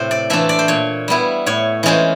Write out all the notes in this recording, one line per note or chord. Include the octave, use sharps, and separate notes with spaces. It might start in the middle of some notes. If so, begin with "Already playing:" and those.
Already playing: A2 C3 C4 C5
D5
E3 A3 D4 F4 E5
D5
C5
A#2 C#5
G3 B3 E4
A2 C#5
E3 G#3 C#4 F4 C5